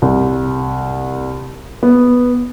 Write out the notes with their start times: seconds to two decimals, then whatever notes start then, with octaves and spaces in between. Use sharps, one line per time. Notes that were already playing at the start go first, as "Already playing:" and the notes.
0.02 C2
1.83 B3